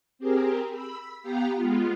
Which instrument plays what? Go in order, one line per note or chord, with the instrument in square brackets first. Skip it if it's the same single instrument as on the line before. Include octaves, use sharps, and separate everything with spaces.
[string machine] C4 G4 G#4 A#4
B5 E6
B3 G4 F5 G5 A#5
G#3 B3 F4